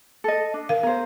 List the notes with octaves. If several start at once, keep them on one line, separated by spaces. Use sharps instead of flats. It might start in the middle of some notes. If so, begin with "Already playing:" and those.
A4 D#5
D4
A#4 F5
B3 A#4 C5